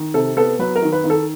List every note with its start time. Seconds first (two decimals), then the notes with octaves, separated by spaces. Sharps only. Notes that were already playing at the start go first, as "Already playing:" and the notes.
Already playing: D#3
0.14 C3 A4
0.37 B3 A4
0.59 F#3 B4
0.76 A#4
0.82 D#3
0.92 B4
1.04 D#3
1.10 A4